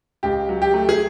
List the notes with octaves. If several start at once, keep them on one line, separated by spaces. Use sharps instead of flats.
C#2 G4
F#3
G4
A3
G#4